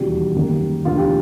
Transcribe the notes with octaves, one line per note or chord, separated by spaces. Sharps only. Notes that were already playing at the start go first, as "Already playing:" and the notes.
Already playing: E1 D#2 C#3 E3 G3 F#4
F#2 D#3 G3 A#3
E1 D2 D3 F4
G4